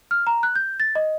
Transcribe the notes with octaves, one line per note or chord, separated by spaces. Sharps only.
F6
A#5
F#6
G6
A6
D#5